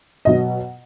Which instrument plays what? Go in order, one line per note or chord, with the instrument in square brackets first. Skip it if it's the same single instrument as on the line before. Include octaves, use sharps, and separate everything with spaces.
[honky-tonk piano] B2 F#3 D#5